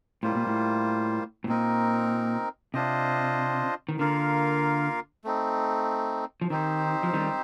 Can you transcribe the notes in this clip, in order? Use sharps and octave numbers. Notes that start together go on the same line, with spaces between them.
A2 G3 A#3 F4 C5
A#2
A2
A2
A#2 C4 D#4 A#4
C3 D4 F4 C5 D#5
D#3
D3 A#3 F4 A#4 F5
A3 C4 D#4
F3
D#3 C4 D#4 G4 C5
F3
D#3 G3